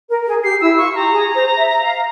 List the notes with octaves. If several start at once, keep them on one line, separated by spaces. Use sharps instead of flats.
A#4
G#4
G4 C7
E4 E6
F4 C#6
G4 A#5
G#4
C5
E5
F5